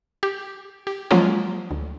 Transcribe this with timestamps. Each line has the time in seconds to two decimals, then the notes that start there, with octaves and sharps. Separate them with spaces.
0.23 G4
0.87 G4
1.11 F3 F#3 G#3 A#3 C#4 F4
1.71 D2